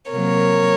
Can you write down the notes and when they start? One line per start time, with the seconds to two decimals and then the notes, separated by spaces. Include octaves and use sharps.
0.11 C3 F#3 A#3 A#4 C#5